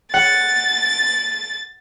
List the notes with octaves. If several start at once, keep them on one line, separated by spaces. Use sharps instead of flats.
F#5 A6